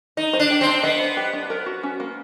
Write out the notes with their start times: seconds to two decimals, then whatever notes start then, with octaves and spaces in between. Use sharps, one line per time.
0.17 D#4 D#5
0.33 C5
0.40 D4
0.50 G4
0.61 C4
0.67 D4
0.83 B3 D#5
1.00 C5
1.17 G4
1.33 D4
1.50 A#4
1.66 F#4
1.83 C#4
2.00 A#3